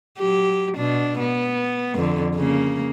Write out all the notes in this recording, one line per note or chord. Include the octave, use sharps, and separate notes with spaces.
F#3 G4
B2 D4
B3
F2 D3
C#3 A#3